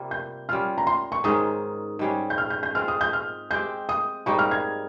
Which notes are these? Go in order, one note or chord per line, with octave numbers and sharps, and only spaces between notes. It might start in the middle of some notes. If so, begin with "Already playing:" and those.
Already playing: C3 G3 A#3 F4
G6
G3 C#4 F4 F6
A#5
C6
C#6
G#2 D#3 G#3 C#4 D#6
G#2 G3 C#4 G#4
G6
F6
G6
G6
G#3 C4 F4 C5 F6
D#6
G6
F6
G#3 C4 G4 G6
D#6
G#2 G3 A#3 D#4 C#6
F6
G#6